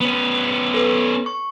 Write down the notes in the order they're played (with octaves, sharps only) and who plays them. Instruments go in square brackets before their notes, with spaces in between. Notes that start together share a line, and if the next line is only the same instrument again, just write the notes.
[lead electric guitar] B3 C#4
[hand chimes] A4 B4
C#6